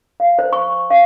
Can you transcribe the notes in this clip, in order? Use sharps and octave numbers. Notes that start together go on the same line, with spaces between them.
F5
C5
C#6
F5